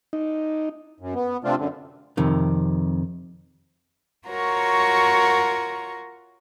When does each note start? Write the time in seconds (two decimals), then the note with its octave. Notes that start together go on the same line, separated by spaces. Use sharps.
0.13 D#4
1.00 F#2
1.15 B3
1.44 C3 A3 C4 D4 F4
1.58 F#2 D3
2.17 F2 C3 D#3
4.27 F4 F#4 A#4 C#5 A#5 C#6